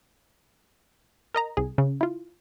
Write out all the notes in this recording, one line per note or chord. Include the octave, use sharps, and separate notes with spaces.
A#4 D#5 A#5
C2 G#4
C#3
E4 F4